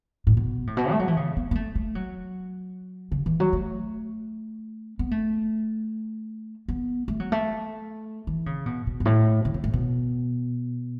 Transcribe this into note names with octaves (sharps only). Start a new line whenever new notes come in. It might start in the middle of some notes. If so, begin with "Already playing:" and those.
A2
B2
A2
B2
A3
F#3
E3
C#3
B3
B3
A3
A3
F#3
C#3
E3
F#3
A3
B3
A3
B3
A3
F#3
A3
E3
C#3
B2
B2
F#2
A2
C#3
B2
A2
B2